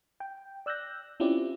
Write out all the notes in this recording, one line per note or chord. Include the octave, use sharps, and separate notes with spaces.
G5
D5 E6 F#6 G6 A#6
C4 C#4 E4 F4 G4 D5